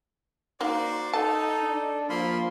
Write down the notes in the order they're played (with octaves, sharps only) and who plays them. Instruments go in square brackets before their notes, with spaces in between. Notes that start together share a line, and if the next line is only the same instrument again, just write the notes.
[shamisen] A#3 D#4 [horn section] F#4 C5 D5
[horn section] D#4 [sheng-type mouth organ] A4 [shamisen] A5
[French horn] D4
[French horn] F3 [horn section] A#3 [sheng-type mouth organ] B5 C6